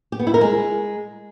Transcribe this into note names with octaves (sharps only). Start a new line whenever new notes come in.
G4
B3
E4
A#4
G#3